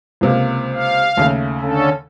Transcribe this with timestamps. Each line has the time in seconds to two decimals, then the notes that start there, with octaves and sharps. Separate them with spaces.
0.21 C#2 C3 A#3
0.73 F5
1.17 D#2 C#3 A3
1.61 D3 C#4 A4